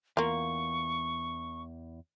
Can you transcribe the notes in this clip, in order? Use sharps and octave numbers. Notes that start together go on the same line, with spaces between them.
E2 A#3 F4 C#6